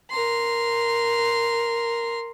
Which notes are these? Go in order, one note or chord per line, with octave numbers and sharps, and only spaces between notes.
A#4 C6